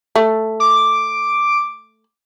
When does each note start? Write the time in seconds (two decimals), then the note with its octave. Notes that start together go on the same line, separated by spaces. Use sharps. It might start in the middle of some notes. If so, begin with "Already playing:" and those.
0.16 A3
0.60 D6